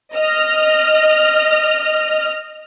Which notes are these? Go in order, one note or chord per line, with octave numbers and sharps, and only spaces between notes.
D#5 F6